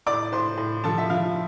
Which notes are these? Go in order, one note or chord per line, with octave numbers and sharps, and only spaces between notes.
A2 D5 D6
A2 C5 C6
A2
F3 A4 A5
E5
F3 F4 F5